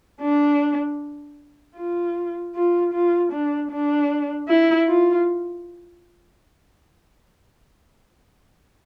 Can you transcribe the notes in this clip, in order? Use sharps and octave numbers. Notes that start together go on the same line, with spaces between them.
D4
F4
F4
F4
D4
D4
E4
F4